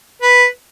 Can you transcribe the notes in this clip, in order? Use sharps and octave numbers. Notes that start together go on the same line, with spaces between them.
B4